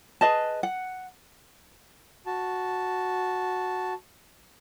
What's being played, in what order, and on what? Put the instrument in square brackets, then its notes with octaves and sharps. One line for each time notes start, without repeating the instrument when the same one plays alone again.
[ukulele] G#4 B4 D#5 A5
F#5
[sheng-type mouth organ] F#4 A5